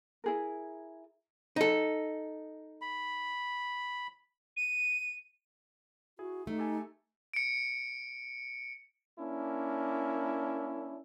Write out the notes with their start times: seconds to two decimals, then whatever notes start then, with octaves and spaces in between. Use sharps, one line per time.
0.24 E4 G#4 A#4
1.56 D#4 A4
2.81 B5
4.57 D#7
6.19 E4 F#4 G#4
6.47 A3 D#4
6.58 G4 A4 G#5
7.34 C#7 D7
9.19 A#3 C#4 D4 E4